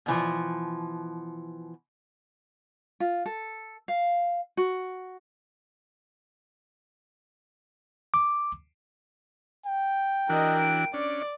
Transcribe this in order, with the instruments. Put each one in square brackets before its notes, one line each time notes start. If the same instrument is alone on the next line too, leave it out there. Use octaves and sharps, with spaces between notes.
[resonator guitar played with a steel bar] B2 E3 F3
[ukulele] F4
A4
F5
F#4
[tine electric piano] D6
[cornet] G5
[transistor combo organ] E3 D4 F#4 [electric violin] A#4 D#5
[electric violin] D7
[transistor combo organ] C#4 D4 [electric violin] D5